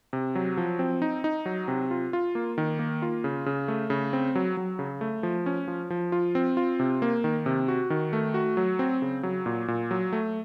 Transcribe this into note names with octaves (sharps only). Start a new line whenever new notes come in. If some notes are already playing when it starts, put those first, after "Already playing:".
C3
F#3
F3
C4
D#4
D#4
F#3
C3
F4
F4
A#3
D#3
A#3
F4
C#3
C#3
A3
C#3
C4
F#3
F#3
C#3
A3
F3
C#4
F3
F3
F4
C4
F4
C3
A#3
D#3
C3
F#4
D#3
A3
F#4
F#3
C4
C#3
F#3
A#2
A#2
F#3
A3